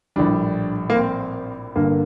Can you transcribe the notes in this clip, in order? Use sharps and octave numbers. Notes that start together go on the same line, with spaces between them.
A#1 A2 G3 D4
A#3
C4
G1 G2 D3 A#3